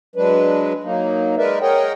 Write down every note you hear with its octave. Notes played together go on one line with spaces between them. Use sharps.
F#3 G#3 D4 B4
F#3 A#3 D#4
G#3 D#4 A#4 B4 D5 E5
G#4 A#4 C#5 D#5 F#5 G5